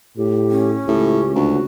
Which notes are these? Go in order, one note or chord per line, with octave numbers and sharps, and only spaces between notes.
A2 G4
C#4
C#2 A2 G4
D2 F#4